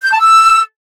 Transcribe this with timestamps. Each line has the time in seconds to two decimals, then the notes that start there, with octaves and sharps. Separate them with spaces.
0.03 G6
0.12 A5
0.20 E6